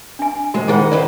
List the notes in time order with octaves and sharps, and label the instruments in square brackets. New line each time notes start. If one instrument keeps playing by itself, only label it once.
[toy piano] D4 G#5
[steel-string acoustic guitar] D#2 G#3 [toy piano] F#4 A4 C5
[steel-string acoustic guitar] D#3 D#4 F#5 [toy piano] G#4 C5 B5
[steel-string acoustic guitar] D#3 B4 C5 [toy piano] D5